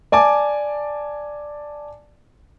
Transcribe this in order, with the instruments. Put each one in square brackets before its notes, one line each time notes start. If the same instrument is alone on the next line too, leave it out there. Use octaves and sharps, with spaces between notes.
[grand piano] D5 G#5 A5 D6